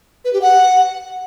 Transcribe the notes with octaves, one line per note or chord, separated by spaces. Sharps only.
B4
G4
F#5